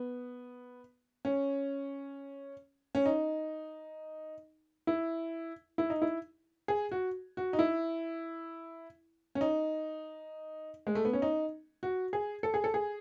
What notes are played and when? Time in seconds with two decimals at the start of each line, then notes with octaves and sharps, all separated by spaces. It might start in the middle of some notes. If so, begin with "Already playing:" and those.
Already playing: B3
1.25 C#4
2.95 C#4
3.06 D#4
4.87 E4
5.78 E4
5.90 D#4
6.02 E4
6.68 G#4
6.92 F#4
7.37 F#4
7.53 D#4
7.59 E4
9.35 C#4
9.41 D#4
10.87 G#3
10.95 A3
11.05 B3
11.13 C#4
11.22 D#4
11.83 F#4
12.13 G#4
12.43 A4
12.54 G#4
12.64 A4
12.74 G#4